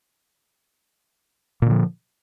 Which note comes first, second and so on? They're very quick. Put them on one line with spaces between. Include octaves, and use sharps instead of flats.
A#2 D3 F3